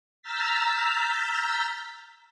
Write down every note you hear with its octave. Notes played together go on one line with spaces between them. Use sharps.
A#5 E6 F6 G6 A6 B6